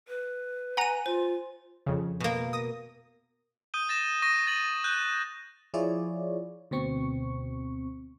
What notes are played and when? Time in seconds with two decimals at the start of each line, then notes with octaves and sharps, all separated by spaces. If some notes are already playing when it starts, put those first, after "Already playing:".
0.08 B4
0.77 F#5 G#5 A#5 D#7
1.06 F4 C5
1.86 F2 C#3
2.20 B2 A#3
2.53 D#6 A#6
3.74 D#6 G6 D#7 G7
3.89 A6 A#6 E7
4.22 C#6 D#6 A#6 D#7
4.47 A6 F#7
4.84 F#6 G6
5.74 F3 E4 F4 G#4 C#5 D5
6.71 D2 B2 C4 C#6